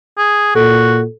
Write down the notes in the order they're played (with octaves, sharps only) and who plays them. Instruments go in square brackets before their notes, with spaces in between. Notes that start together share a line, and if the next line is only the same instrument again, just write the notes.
[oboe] G#4
[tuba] A#2 [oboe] F#4 [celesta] A4